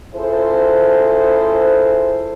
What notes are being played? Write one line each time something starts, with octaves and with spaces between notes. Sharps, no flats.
C#4 E4 F4 G#4 A4 C5